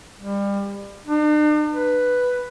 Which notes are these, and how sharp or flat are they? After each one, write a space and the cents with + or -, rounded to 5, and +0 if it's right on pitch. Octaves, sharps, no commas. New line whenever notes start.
G3 +30
D4 +45
B4 +0